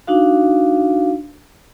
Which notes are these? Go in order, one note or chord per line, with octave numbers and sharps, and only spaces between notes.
D4 D#4 F#4 F5